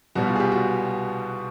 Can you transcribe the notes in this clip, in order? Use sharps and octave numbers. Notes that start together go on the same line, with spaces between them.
C2 B2 G3 B3 F#4
F4
G#4
G4
F#4